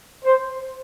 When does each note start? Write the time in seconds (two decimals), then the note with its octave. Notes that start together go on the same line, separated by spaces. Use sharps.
0.24 C5